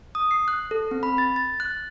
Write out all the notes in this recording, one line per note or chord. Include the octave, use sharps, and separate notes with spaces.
D#6
C7
F#6
A4
C4
B5
A6
A6
F#6